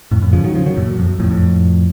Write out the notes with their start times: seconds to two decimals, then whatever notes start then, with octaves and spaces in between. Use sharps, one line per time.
0.11 F2 A2
0.22 F2 A2
0.33 C#3 F3
0.44 D#3 F#3
0.55 C#3 F3
0.66 D#3 F#3
0.77 F#2 A#2
0.87 F#2
0.99 F2
1.09 F#2
1.20 F2 A2
1.30 F2 A2